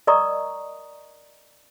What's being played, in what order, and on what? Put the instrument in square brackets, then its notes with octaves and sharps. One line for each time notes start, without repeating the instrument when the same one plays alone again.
[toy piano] A#4 D5 D#5 A#5 C#6 D#6